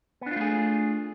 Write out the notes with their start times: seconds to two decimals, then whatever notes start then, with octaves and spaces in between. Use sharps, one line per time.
0.21 B3
0.26 D4
0.31 F4
0.36 A3
0.41 G#4